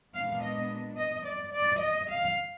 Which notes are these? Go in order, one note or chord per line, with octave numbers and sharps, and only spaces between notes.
A#2 G#3 B3 D4 F5
D#5
D#5
D5
D5
D#5
F5